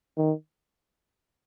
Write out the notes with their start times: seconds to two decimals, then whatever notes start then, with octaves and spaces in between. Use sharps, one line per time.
0.17 D#3